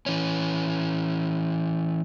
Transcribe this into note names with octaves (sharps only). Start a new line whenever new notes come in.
E3 C#4